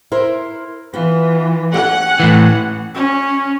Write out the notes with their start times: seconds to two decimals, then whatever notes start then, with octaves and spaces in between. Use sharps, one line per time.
0.12 E4 A#4 C5
0.94 E3 B3 F4
1.74 C#4 G4 F#5
2.20 A2 E3
2.95 C#4